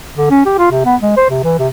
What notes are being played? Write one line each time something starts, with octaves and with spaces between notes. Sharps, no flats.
D3
C#4
G4
F4
C3
B3
G#3
C5
C3
E3
C3